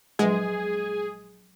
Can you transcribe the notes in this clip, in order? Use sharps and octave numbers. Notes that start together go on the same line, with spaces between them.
A#1 F#3 G#3 G#4 B4 F#5